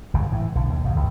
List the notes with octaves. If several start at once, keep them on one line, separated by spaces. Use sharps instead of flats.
G1 C#2 C#3
A2 E3
B1 D3
D#2
B1 G#2
C#2 G#2